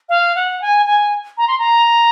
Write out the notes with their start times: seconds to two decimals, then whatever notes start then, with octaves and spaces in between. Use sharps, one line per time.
0.09 F5
0.35 F#5
0.62 G#5
0.86 G#5
1.38 A#5
1.48 C6
1.59 A#5